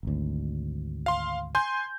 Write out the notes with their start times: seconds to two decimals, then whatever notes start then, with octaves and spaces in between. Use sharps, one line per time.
0.03 G#1 D2
1.06 F5 C6
1.55 G#5 C6 G6